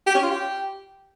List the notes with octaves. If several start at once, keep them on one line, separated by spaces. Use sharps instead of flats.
G4
C#4
F4
G4